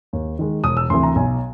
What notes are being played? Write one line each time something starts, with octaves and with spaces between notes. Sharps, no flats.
D#2
D#3 G#3
E1 D#6
E6
D2 C3 E3 C6
A#5
B1 G#5